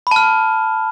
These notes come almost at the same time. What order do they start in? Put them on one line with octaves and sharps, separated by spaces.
B5 A5 F6